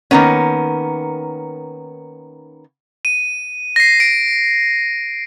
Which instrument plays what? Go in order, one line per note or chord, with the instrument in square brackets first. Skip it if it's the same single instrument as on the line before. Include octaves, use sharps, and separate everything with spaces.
[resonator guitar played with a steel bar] D#3 G#3 A#3 B3 C#4
[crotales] D#7
A#6 C7
D7